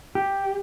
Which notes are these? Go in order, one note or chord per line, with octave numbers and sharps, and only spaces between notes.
G4